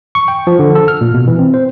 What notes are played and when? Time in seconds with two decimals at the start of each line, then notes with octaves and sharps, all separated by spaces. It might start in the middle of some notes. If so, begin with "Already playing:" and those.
0.15 C#6
0.28 G5
0.47 F3
0.59 D3
0.75 A4
0.88 F6
1.01 A#2
1.14 B2
1.27 E3
1.39 C4
1.54 C5